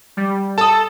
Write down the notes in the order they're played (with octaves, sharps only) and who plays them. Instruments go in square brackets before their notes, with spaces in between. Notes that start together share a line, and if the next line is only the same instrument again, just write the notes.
[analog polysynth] G3
[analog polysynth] A4 [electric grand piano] A5 D#6